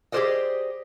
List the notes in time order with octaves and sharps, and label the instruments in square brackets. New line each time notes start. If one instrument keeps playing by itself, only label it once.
[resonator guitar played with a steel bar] G4 G#4 A#4 C5 D5 D#5